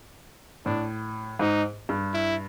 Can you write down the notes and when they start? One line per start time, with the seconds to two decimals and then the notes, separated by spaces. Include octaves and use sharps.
0.66 A2 D4
1.39 G#2 D#4
1.89 G2
2.14 E4